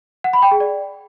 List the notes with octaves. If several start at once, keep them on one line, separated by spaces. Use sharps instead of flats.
F#5
B5
G5
G#4
D5